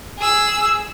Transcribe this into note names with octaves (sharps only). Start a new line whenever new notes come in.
G#4 E6